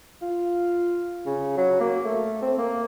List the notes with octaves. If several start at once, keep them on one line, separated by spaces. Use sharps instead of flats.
F4
C#3
F#3
A#3
A3
C4
A#3